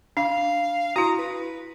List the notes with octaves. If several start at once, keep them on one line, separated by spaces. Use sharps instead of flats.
D4 F5
E4 F#4 A#5
B4